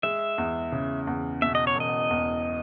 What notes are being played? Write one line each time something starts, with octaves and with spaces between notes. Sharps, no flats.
G#3 E5
E2
C#3
E2
B2 E5
D#5
C#5
E1 D#5
E2